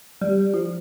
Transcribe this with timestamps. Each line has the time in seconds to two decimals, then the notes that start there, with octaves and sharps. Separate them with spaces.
0.21 G3
0.54 F3